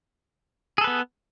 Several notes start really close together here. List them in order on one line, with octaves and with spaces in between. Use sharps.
G#4 A4 B4 B3